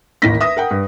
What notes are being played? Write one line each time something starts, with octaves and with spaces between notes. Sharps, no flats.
A1 D#2 A#3 A#6 B6
B4 E5 D#6 A#6
A#4 F#5 G5
G2